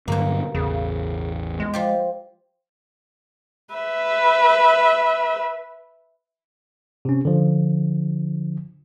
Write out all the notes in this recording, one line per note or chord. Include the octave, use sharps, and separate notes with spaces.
G2 B2 D3 F#3 A#3
A1 E2 C#3
G#3
F3 F4 G4
B4 E5
C3 C#4
D3 F3